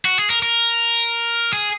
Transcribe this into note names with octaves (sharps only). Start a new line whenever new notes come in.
F#4
G#4
A#4
A#4
G#4